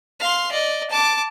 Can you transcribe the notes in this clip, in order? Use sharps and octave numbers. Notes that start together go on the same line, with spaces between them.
F5 C6
D5 D#5
A5 D6